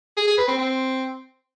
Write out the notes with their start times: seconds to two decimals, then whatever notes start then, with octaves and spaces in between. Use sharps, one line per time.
0.17 G#4
0.27 G#4
0.38 B4
0.48 C4
0.58 C4